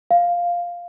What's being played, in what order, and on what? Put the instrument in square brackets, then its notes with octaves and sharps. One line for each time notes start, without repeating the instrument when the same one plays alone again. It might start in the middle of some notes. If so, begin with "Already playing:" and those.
[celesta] F5